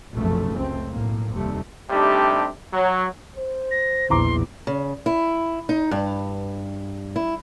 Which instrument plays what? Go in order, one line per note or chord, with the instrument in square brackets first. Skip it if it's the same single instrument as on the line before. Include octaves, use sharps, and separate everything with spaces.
[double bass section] F1 B1 F#2 C#3 F3 A3
C#2 A3 C4
B1 A2 A#3
F1 D#2 C3 G3 A3
[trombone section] C3 G3 A3 D4 D#4 G4
F#3
[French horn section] C5
[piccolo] A#6
[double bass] A#1 E2 [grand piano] E3 A#5 D6 [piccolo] C6
[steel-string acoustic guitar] C#3
E4
D#4
G2
E4